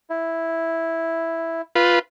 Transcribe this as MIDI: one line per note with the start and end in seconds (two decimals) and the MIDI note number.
0.10 1.61 64
1.75 1.99 65
1.75 1.99 71